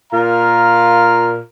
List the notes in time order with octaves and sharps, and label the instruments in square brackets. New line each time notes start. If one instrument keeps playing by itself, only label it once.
[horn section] A#2 F4 A#4 F5 A#5